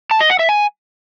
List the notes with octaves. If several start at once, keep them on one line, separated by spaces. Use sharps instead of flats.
A5
D#5
F#5
E5
G#5